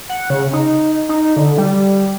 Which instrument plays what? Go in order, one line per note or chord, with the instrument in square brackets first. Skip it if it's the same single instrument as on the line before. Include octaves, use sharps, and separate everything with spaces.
[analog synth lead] F#5
C#3
D#4
D#4
D3
G3